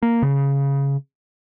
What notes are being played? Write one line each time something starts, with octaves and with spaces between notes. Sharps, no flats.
A#3
C#3